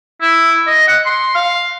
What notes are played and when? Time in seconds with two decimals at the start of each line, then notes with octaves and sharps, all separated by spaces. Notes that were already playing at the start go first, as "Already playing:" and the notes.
0.21 E4
0.67 D#5
0.87 F#5
1.05 C6
1.35 F5